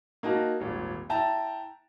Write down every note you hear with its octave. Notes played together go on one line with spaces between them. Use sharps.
A#3 D#4 F#4 A5
D#1 G#1
E4 G5 A5 A#5